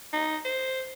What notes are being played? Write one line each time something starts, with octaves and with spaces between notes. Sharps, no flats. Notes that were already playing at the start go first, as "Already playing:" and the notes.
D#4
C5